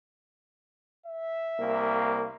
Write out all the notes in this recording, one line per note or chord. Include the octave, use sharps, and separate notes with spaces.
E5
C2 A#3